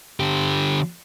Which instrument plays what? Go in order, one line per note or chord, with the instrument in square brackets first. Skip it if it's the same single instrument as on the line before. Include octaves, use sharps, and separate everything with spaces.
[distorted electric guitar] D3 G4